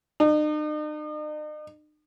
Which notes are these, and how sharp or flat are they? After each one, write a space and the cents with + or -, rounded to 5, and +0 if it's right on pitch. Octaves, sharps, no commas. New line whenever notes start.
D#4 -45